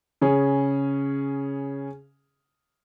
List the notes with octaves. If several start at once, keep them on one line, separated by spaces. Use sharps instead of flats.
C#3 C#4 G#4